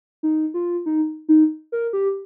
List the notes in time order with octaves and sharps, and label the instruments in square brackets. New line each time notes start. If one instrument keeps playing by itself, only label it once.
[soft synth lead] D#4
F4
D#4
D#4
A#4
G4